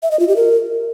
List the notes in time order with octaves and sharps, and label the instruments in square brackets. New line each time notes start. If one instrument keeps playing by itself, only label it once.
[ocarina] E5
D#5
F4
G4
A#4